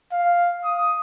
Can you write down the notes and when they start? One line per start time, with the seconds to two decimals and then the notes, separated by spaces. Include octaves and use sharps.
0.12 F5
0.64 D#6